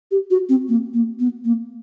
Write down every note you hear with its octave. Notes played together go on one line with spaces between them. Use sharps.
G4
F#4
C4
A#3
A#3
B3
A#3